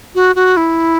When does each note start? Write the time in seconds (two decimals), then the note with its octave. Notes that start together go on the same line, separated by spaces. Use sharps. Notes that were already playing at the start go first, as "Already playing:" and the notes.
0.15 F#4
0.35 F#4
0.57 E4